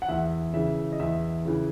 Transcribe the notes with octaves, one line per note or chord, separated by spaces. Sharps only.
F#5
E2 E5
C#3 E3 E5
D#5
E2 E5
C#3 E3